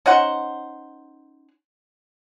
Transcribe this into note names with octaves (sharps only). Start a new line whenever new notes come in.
C#4 D#4 C5 F#5